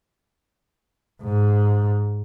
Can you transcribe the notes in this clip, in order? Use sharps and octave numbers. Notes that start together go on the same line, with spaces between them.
G#2